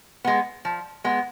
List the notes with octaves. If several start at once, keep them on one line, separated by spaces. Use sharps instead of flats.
G#3 B3
F3
G#3 B3